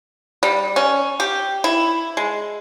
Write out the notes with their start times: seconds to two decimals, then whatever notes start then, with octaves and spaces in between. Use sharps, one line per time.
0.43 G3
0.76 C#4
1.20 G4
1.64 E4
2.17 G#3